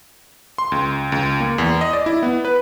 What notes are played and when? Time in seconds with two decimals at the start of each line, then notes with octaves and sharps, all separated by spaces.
0.58 C6
0.72 C#2
1.12 C#2
1.41 A#3
1.58 E2
1.81 D#5
1.93 D5
2.06 E4
2.23 B3
2.45 B4